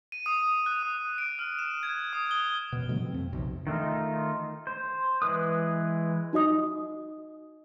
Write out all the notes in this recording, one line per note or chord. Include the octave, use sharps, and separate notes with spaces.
D#7
D#6
F#6
D#6
D7
F6
E7
G#6
D#6
G7
F#2 B2
B2 D3 F#3 A3
B2 C4
F2
B1 C3
D#3 A3 D#4 F4
C5
E3 G#3 B4 D#6
D#4 F#4 D#5 D#6